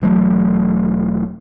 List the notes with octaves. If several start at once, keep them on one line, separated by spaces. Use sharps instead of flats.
E1 E3 F#3 A3